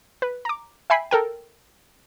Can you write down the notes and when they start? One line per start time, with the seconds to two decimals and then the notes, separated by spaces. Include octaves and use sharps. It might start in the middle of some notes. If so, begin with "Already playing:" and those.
0.22 B4
0.45 A#5 D6
0.90 E5 G5 G#5 B5 B6 C7
1.11 A4 A#4 G5